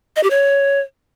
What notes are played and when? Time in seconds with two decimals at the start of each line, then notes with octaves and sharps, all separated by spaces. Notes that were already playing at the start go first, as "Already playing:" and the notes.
0.16 D#5
0.23 G4
0.30 C#5